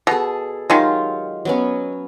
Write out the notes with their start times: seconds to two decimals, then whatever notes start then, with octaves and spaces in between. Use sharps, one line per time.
0.07 B2 G#4 A4
0.70 D#3 F#3 G#3 F4 G4
1.45 F#3 B3 C#4